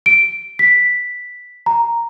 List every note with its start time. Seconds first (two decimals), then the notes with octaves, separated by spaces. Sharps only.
0.06 D7
0.59 B6
1.66 A#5